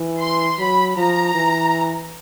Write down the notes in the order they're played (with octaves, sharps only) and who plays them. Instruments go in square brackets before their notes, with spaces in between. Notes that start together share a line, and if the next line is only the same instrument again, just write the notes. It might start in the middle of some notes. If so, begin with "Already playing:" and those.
Already playing: [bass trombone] E3
[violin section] C6
[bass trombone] F#3 [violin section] B5
[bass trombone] F3 [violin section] A#5
[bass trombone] E3